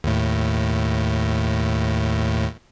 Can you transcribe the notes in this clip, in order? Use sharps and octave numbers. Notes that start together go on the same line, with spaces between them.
D#2 A2